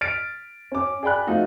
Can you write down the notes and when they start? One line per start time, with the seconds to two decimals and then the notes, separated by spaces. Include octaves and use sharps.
0.01 F6 A6 B6 D7
0.72 C#4 D6
1.03 G#4 D5 G5 B5 F#6
1.27 F3 A3 D#4 F4 F#4